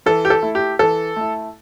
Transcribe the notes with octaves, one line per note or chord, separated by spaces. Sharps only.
E3 A4
G4
A4
A3 E4
G4
E3 A4
A3 E4